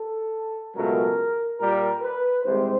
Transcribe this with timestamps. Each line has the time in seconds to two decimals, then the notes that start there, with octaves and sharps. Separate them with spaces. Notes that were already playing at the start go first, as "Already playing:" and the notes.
Already playing: A4
0.74 C#2 B2 F#3 A3 A#4
1.59 A#2 G3 A#4
2.01 B4
2.43 C2 C3 D#3 G#3 C5